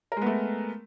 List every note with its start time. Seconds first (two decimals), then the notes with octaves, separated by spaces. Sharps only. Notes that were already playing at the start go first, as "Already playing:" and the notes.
0.12 A#4
0.17 G#3
0.22 B3
0.26 A3